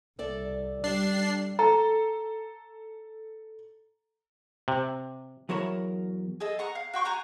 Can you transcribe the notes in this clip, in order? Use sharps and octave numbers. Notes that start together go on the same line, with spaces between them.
C2 A4 D5 E5
G3 D4 C7
A4 A#5
C3
E2 F#3 A#4 C#5 A5 B5
G#4 A4 D#5
F#5 A#5 C#6
F5
F#4 G5 C#6 G6
F#4 G#5 A#5 G6